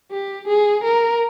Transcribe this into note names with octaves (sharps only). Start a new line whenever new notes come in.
G4
G#4
A#4